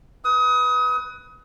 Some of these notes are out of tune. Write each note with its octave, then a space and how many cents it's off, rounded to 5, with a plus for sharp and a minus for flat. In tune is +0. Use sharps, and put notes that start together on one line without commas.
B4 +0 D#6 +30